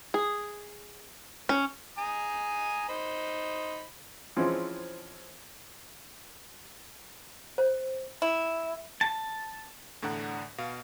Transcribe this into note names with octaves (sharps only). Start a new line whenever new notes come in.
G#4
C#4
G#5 A#5 D#6
D#4 C5 B5
E3 F3 G#3 C4 C#4
C5
E4
A5
E2 A2 D3 D4 F#5 A#5
B2 F5